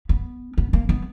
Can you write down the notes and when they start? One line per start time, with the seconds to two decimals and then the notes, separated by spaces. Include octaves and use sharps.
0.09 B3
0.58 B3
0.73 A#3
0.89 B3